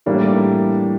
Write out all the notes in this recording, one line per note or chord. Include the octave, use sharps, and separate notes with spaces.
A2 E3 G3 A#3 D4